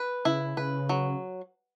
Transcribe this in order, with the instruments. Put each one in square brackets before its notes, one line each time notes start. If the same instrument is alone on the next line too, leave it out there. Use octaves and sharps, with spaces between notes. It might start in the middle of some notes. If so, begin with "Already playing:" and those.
Already playing: [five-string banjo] B4
[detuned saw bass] C#3 [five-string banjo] E4
[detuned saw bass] C#3 [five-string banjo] B4
[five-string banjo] F#3